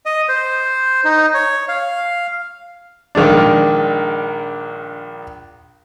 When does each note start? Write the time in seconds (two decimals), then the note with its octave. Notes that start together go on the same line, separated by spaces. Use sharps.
0.06 D#5
0.29 C5
1.05 D#4
1.34 C#5
1.69 F5
3.15 A#1 D#3 G#3 D4